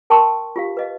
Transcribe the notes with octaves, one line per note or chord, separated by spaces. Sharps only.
A#4 G5 A5 C6 C#6
F4 G4 F5
B4 D#5 F5